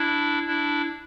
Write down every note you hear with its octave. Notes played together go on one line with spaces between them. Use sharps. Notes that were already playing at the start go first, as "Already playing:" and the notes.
Already playing: D4 E4
D4 E4